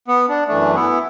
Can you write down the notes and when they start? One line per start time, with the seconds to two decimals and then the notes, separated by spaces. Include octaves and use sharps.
0.08 B3
0.29 D4
0.48 F#2 E3 A3 D4
0.75 B3 E4